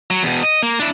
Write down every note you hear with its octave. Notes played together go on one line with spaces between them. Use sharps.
F#3
E2 B2
D#5
A#3
D4 E4